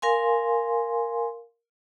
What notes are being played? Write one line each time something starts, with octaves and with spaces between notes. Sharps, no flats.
A#4 F5 G#5 C6